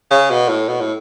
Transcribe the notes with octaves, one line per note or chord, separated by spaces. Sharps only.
C#3
B2
A2
B2
A2